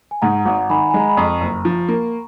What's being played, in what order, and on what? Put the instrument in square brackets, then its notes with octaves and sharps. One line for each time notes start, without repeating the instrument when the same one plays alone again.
[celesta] G#5
[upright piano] G#2 [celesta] F#5 A#5
[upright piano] G#1 [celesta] F#5 A#5
[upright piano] D#3 [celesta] G#5 B5
[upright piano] G#3 [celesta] G#5
[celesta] A#5
B5
[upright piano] F2 [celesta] A#5 C#6
[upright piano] F#1
F3
A#3